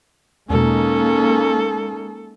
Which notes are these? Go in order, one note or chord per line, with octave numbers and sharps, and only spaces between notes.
E2 B2 G#3 A#3 C#4 D#4 A4